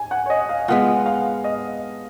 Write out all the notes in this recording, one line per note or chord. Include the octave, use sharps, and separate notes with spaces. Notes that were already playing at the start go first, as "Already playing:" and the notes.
Already playing: G#5
F#5
C#5
D#5
F5
G#3 B3 F4 F#5
F5
D#5